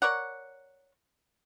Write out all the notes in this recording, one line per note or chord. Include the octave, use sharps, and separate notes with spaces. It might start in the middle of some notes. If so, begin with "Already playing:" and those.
A#4 C#5 D5 F#5